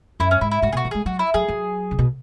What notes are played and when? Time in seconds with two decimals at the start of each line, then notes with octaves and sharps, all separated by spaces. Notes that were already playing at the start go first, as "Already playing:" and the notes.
0.20 F#2 E4
0.31 C#4
0.41 G#2 E4
0.51 E4
0.62 G#2 F#4
0.72 B2 F#4 G#4
0.85 E3
0.91 G#3 G#4
1.06 F#3 F#4
1.19 E4
1.34 F#3 G#4
1.48 F#3
1.91 C#3
1.99 B2